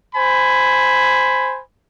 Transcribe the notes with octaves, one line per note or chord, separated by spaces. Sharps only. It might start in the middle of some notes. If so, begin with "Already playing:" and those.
C5 G#5 B5